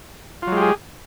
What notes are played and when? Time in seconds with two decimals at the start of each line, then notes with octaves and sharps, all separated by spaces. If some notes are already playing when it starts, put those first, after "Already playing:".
0.42 F4
0.47 F#3
0.52 G#3
0.57 G4
0.62 G#4